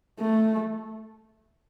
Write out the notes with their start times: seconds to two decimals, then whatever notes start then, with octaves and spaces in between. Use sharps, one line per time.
0.20 A3